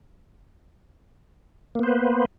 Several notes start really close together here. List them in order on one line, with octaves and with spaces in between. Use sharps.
A#3 B3 C5 B4